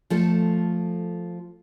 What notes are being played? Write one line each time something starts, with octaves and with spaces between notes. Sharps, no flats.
F3 A3 A4